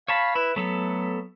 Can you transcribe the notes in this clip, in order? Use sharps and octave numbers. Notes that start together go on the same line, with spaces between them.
C#5 F5 A5 B5
E4 B4
F#3 A3 B3 A4